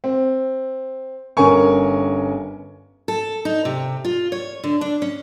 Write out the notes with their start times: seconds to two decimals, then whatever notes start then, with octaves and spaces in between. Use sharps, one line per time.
0.04 C4
1.37 G1 C#4 A#4 G#5 C#6
3.08 A4
3.45 D#4
3.65 C3
4.05 F4
4.32 C#5
4.64 D3
4.81 D4
5.02 C#4